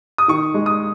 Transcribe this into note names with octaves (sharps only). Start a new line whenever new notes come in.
D#6
D#3 C#6
G#3
D#6